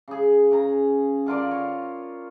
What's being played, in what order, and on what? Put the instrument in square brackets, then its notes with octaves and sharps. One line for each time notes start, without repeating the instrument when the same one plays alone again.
[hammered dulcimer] C#3 G#4
C#3 A#5
D3 F4 A#4 D5
C#5